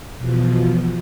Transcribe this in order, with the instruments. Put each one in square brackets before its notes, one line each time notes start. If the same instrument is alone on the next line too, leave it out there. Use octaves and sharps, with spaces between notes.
[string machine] E2 B2 F3